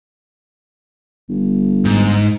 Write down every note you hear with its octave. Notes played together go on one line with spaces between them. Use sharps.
G1
G#2